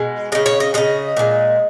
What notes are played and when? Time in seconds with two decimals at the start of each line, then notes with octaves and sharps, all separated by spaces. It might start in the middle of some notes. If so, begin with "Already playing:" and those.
Already playing: B2 G#3
0.32 C#3 G#3 D#5
0.46 C#5
0.60 D#5
0.74 C#3 G#3 D#5
1.17 A#2 F3 G#3